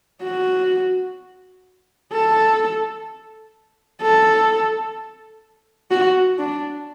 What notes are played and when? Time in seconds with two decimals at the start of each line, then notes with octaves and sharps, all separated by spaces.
0.23 F#4
2.13 A4
4.02 A4
5.91 F#4
6.39 D4